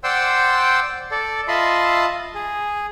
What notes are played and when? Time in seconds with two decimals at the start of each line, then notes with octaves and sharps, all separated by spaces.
0.04 C5 D5 F#5 G5 C6 E6
1.11 A4 D5
1.48 F4 D#5 E5 A5 B5 C6
2.35 G#4